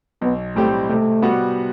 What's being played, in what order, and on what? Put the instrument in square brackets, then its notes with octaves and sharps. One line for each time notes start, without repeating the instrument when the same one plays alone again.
[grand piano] B1 [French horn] B3
[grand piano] A2 G3 C4 G4 [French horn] A3
[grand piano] C3 [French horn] A3
[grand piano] G3 B3 F#4